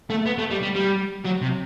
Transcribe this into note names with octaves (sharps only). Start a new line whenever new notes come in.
A3
B3
A3
G3
G3
G3
F#3
C3